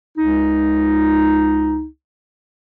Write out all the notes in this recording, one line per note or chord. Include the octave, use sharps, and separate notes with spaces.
C#2 D#4